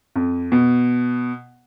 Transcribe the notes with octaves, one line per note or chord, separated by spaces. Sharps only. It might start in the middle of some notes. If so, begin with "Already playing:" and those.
F2
B2